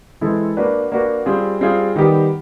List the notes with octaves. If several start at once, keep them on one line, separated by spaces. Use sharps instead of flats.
E3 G#3 C4 E4 A4
A#3 D4 F#4 B4
A#3 D4 F#4 B4
G3 C4 F4 G#4
G3 C4 F4 G#4
D#3 G3 B3 D#4 G4